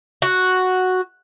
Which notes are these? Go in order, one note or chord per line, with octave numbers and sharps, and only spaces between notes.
F#4